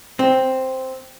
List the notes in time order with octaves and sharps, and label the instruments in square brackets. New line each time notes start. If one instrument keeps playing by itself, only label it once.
[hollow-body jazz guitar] C4